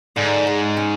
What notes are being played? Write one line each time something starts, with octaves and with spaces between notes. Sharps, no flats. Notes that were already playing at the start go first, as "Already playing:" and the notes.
G#2 D3
G#3
C#4